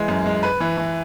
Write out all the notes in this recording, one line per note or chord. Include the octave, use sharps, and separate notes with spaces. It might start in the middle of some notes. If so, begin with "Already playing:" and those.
Already playing: E3 G#3
F#2
G#3
B4
E3
E3